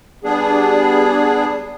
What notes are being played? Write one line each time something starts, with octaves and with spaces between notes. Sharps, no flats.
G3 B3 D4 G#4